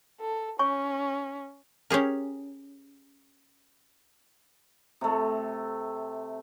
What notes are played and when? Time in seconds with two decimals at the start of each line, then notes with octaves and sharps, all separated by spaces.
0.21 A4
0.59 C#4 C#5 G#5 C#6
1.90 C#4 G4 G#4 A#4
5.01 C3 A3